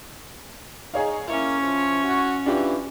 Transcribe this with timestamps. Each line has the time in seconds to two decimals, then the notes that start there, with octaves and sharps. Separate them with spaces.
0.94 D#4 G#4 C#5 F5
1.28 A#3 C#4 E4 C#5
1.62 F3
2.04 F#4
2.46 E3 D4 F4 G4